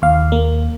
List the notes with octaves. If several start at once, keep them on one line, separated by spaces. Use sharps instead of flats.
D#2 F5
A#3